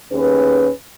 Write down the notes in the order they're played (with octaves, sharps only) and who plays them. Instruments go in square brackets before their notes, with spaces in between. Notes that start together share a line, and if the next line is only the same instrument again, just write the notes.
[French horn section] D#2 C#4 G#4 B4